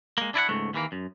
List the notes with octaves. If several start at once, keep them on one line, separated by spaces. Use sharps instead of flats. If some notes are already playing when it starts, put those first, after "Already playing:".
G#3 A#3
D4 E4 D5 F#5
C#2 G#2 A3
D#2 E3 A#3
F#2